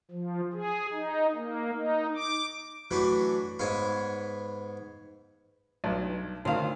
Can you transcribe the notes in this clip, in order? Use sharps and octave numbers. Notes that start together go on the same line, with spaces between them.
F3
G#4
D#4
A#3
D#4
D6
E3 F#3 A3 D4 F#4 B4
G#2 B3 C#5 F5 G#5
B1 G2
D2 D#3 C5 F5